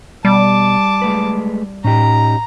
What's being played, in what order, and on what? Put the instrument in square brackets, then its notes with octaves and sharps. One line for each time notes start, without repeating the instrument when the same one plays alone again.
[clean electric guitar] B2 [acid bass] G3 [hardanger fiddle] A5 D6
[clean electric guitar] G#3 A3 B4
[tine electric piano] A2 [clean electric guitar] C#4 D#4 G4 [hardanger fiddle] A#5